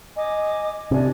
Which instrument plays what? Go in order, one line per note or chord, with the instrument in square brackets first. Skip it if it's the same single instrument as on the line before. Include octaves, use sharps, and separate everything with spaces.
[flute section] D#5 G#5 D6
[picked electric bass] C3 [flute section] D4 G#5